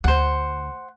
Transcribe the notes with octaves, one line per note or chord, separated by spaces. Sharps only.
D2 C5 F#5